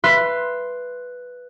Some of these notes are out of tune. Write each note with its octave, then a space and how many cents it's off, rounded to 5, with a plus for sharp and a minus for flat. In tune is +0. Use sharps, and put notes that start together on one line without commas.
B4 +0 E5 +30 C6 +0